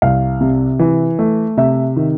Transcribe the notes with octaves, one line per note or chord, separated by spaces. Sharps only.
C2 F5
C3
E3
A3
C3 E5
D#3